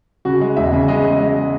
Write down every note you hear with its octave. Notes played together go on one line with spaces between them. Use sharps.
C#3 F#4
G#3
E1 E5
C#3
G#3 D#5
G#3
G#3